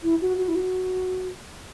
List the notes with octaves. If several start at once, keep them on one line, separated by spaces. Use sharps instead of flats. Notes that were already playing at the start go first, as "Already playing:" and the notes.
E4
F#4
F#4
E4
F#4